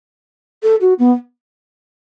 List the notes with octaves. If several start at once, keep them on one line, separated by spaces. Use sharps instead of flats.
A4
F#4
B3